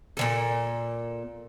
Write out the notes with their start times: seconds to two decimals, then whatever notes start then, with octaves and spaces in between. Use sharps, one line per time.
0.17 A#2 E3 A4